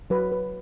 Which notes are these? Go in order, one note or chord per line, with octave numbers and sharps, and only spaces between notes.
F#3 B4
B4